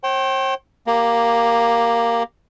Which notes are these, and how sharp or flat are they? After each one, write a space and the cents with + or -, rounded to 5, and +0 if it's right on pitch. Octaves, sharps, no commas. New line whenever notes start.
C5 +45 G5 -25
A#3 +0 G4 +0